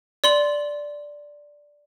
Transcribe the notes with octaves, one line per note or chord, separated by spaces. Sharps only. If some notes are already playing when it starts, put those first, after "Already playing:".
D5 C6 F#7